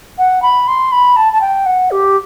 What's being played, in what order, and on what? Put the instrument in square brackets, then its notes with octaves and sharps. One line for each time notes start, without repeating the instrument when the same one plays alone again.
[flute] F#5
B5
C6
B5
A5
A5
G5
F#5
G4